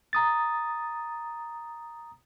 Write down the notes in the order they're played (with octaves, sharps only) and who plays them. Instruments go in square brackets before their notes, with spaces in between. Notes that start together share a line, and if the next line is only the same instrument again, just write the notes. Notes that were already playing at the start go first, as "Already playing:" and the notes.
[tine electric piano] A#5 D#6 A6